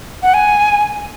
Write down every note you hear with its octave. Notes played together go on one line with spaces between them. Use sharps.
F#5
G#5